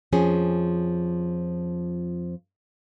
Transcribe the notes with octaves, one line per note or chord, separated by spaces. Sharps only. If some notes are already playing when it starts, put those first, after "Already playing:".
F2 F3 C#4 G#4